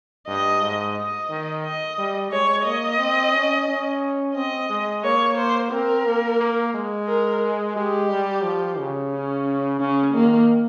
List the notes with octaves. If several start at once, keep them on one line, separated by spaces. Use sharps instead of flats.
G2 D#5
G#2
D#5
D#3
D#5
G3
G#3 C#5
A#3 D#5
C4
C#4
C#4
C4 D#5
G#3
A#3 C#5
C5
C4 A#4
A#3
A#3
G#3
A#4
G#3 G4
G3
F3
C#3
C#4
C#3 C#4
D#3 A#3